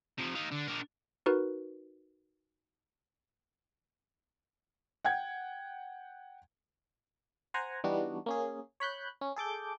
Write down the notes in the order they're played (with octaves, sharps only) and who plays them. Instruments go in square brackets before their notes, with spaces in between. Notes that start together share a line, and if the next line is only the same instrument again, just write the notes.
[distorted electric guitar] C3 F3
D#4 F5
D3
D4 A#4
[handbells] D#4 F#4 A#4 B4
[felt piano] F#5 G5 G#6
[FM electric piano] C5 F#5 G#5 A#5
E3 G3 B3 D4 D#4 F#4
A#3 C#4 G#4
C#5 B5 F#6 G6
C#4
G#4 A4 D6 G6